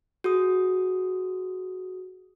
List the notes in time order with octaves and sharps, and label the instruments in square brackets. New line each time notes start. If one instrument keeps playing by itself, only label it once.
[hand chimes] F#4 G#4 D#6